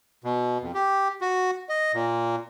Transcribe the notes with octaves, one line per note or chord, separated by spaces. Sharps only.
B2
F2
G4
F#4
D#5
A#2